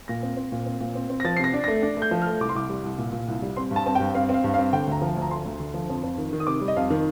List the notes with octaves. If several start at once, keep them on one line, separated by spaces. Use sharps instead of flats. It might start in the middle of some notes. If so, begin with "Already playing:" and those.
A#2 A#6
C4
C4
A#2
C4
A#2
C4
C4
A#6
F3 A6
C3 C7
A#6
D4
A3 A#6
D4
A3 G6
F3
A3 F6
C2 D6
C6
C2 D6
G3
C2
A#2
A#2
C2
G3
C4 C6
G2
A5
C4 A5
G2 G5
C4 F5
C4 F5
G2
C4 F5
D3 G5
D2 A#5
F3
D2
A#5
D3 C6
D2
D3
F3
F2
F2
D#3
D#3
D#6
C3 D6
G3
D#5
F2 F5
D#3